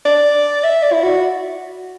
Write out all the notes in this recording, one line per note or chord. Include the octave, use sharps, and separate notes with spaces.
D5
E5
D5
E4
F#4